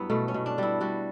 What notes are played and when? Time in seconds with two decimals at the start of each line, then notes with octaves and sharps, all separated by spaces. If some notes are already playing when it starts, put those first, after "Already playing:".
Already playing: G2 F#3 B3 E4
0.10 B2 A3
0.28 C#4
0.34 B2
0.46 D4
0.58 G3 E4
0.81 G3 F#4